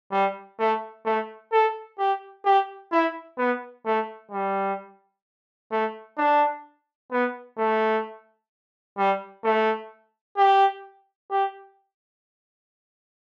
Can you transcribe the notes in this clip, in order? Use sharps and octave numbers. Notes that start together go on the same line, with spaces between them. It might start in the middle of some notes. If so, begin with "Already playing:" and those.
G3
A3
A3
A4
G4
G4
E4
B3
A3
G3
A3
D4
B3
A3
G3
A3
G4
G4